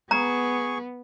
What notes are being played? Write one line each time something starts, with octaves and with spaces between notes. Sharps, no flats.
B3 G#4 A#5 C#6